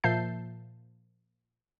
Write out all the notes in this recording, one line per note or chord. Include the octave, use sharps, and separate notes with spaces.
A#2 F3 E5 A5 G6 C7